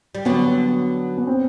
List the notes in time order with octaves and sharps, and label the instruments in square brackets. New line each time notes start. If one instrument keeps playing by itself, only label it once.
[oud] G3
[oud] D3 F#3 [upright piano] B3
[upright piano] B3
C4